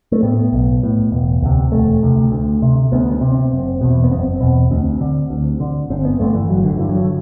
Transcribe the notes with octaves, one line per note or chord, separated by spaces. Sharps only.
A3
A2 B3
B1
A2
E1
D2 C3
E1 A3
D2 C3
D2
C3
D2 B3
C4
C3
C4
F#1
E2 B2
B3
F#1 C4
E2 B2
D2 C4
D3
D2
D3
G1 C4
B3
G2 D3 A3
E3
G1 F#3
D3
G2 D3 E3
F#3
D3